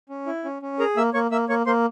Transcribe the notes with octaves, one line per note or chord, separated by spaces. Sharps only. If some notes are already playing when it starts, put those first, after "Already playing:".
C#4
E4
C#4
C#4
G#4 A#4 A#5
A#3 E5 E6
A#3 C#5 C#6
A#3 E5 E6
A#3 C#5 C#6
A#3 C5 C6